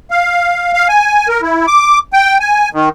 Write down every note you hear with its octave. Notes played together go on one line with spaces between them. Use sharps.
F5
F5
G#5
A#4
E4
D6
G5
G#5
D#3